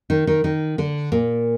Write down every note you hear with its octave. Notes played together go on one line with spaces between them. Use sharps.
D#3 D#4
D#3 D#4
D#3 D#4
D3 D4
A#2 A#3